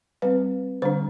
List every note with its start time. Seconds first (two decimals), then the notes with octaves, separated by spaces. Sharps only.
0.22 G3 C4 B4
0.82 D3 G3 D4 C5